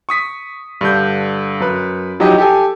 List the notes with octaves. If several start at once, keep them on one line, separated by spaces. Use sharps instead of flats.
C#6 D#6 B6
G2 D3 G6
F#2 B4
F3 F#3 D#4 E4 G4 D#5
G4 A4 G#5